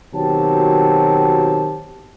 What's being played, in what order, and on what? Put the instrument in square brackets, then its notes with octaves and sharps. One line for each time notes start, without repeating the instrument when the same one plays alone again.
[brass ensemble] B2 D#3 F#3 C4 G4 A5